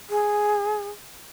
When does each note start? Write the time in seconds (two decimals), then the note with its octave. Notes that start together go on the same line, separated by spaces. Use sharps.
0.10 G#4